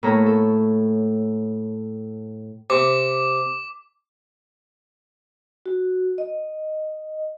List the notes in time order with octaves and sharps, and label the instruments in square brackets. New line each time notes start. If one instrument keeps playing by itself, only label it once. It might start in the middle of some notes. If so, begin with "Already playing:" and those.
[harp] A2 A#3 A4 C#5 A#5
A4
[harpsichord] C3 [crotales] D6
[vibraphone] F#4
D#5